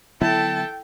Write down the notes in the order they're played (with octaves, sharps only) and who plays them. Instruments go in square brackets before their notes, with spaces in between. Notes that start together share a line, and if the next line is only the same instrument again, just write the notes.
[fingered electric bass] D3 F#3 B3 [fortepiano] E4 [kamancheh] A4 A5 [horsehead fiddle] G5